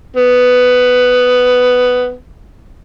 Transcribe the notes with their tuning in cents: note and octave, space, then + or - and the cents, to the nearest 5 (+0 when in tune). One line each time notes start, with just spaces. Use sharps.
B3 +10